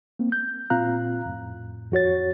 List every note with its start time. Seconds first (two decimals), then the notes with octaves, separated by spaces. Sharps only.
0.19 A#3 C4
0.32 G6
0.70 A#2 C4 F4 F5 A#5 F#6
1.26 F2 A2
1.92 F2 F#4 C#5 A6